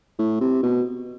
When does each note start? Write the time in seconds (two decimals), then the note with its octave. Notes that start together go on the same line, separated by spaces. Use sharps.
0.19 A2
0.41 C3
0.63 B2